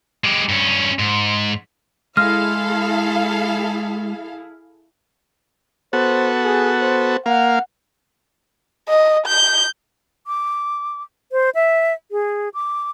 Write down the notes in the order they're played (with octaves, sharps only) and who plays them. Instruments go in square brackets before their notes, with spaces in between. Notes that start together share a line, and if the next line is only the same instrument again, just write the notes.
[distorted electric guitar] G#3 G4
G2 C#4
G#2
[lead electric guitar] G#3 [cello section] E4 G#4 [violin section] A4 F5 [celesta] F6
[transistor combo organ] B3 F#4 A4 [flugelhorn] C5
[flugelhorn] G#4
C5
[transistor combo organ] A#3 F5 [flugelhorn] F#5
[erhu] D#5
G6
[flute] D6
C5
E5
G#4
D6